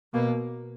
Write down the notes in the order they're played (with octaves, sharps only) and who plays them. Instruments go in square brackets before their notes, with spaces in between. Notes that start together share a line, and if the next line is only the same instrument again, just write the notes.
[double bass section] B2 [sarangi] A#3